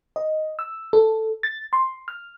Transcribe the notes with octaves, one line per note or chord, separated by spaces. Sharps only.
D#5
E6
A4
A6
C6
F6